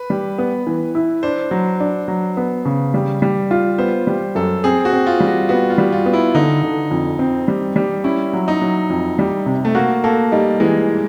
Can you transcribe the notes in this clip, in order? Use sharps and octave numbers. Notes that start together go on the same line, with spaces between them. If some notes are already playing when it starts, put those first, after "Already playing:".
Already playing: B4
G3
B3
E3
E4
D4 C5
F#3
D4
F#3
B3
C#3
G3
G3
F4
B3 C5
G3
F#2 A4
C4 G#4
F#4
C4
F4
G3
F#4
B3 F#4
F4
G3
F4
B3
E4
D3 D#4
D3
F2
C4
G3
G3
C#4 E4
F#3
D#4
F#3
F2
G3
C3
A3
A#3 F#4
A#3 A4
G3 D#4
E3 G#3